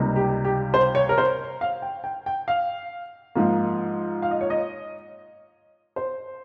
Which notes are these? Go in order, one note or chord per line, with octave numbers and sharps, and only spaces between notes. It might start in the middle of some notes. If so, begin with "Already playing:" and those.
Already playing: C#2 C3 G3 A#3 D#4
G4
G4
C5
C#5
A#4
C5
F5
G5
G5
G5
F5
G#2 F3 A#3
F5
D#5
C#5
D#5
C5